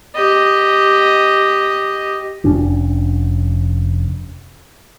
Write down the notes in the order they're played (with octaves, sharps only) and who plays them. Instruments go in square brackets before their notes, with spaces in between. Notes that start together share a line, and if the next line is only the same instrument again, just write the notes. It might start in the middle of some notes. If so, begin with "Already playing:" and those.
[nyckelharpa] G4 D#5
[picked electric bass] F1 C#4 D4